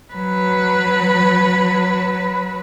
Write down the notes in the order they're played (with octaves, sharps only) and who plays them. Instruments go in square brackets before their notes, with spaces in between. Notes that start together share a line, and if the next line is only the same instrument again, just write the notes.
[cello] F#3 B4